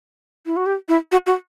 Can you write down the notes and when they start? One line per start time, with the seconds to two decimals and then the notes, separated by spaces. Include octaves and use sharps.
0.46 E4
0.56 F#4
0.66 G4
0.89 E4
1.12 F#4
1.26 F#4